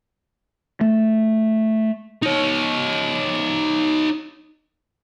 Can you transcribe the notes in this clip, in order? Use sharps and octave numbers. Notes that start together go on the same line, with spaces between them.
A3
D#4 C#5